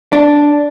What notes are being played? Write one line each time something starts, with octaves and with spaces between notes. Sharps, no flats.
D4